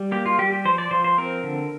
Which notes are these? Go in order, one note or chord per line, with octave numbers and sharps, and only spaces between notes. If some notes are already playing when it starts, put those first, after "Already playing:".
Already playing: G3
A#3 G4
F4
G3 G4
G4
F3 C5
D5
F3 C5
C5
C4 A#4
D3